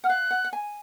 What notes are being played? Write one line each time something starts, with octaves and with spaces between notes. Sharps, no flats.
F#5 F6
F5 F#6
F#5
F#5
G#5